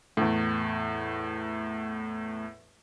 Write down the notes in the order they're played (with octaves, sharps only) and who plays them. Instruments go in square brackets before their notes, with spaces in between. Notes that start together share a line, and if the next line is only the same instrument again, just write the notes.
[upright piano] E2 A2